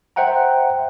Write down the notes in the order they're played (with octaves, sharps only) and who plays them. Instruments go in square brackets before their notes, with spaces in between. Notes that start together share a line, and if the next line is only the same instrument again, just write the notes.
[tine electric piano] C5 E5 F#5 G5 A#5